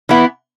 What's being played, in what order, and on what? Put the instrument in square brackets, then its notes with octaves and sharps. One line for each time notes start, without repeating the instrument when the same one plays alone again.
[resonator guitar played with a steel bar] E3 B3 E4